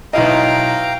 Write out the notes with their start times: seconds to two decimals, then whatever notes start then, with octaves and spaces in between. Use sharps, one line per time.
0.13 B1 E4 D#5 F5 G5 A#5